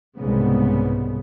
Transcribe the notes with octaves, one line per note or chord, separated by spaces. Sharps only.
C2 G#2 C#3 B3